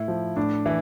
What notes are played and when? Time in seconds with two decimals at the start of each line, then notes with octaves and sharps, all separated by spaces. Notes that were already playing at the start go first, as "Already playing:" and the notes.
Already playing: A2 E4
0.08 F3
0.36 A2 D4
0.66 E3 E4